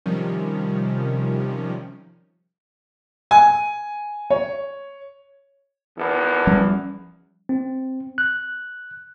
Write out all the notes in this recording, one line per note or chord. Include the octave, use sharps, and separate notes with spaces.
C3 D#3 F3 G3 C#4
G#5
C#5
G#1 E2
F3 G3 C#4
C4
F#6